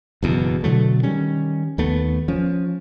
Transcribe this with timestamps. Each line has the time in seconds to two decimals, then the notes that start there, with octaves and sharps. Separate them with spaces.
0.23 F#1 E2 B2
0.64 B2 D3 F#3 A3
1.03 D#3 G3 C#4
1.78 D#2 A3 B3
2.28 F3 C#4